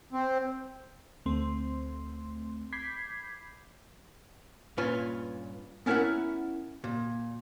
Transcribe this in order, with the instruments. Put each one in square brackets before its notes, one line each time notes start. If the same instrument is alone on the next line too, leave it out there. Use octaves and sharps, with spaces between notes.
[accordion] C4
[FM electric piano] D2 A3 C4 C6
B5 D6 G6 G#6 B6 C7
[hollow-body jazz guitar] G2 A#2 C#4 F4 B4
B3 C#4 E4 A#4 E5 F#5
A#2